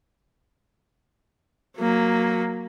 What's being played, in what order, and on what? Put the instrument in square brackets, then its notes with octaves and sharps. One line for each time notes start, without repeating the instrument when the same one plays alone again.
[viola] F#3 A#3